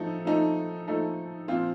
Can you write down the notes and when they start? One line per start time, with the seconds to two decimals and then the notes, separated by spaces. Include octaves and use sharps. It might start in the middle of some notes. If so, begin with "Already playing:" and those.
Already playing: F3 A3 D#4 A4
0.25 F3 A3 D#4 A4
0.87 F3 A3 D#4 A4
1.48 A#2 F3 C4 F4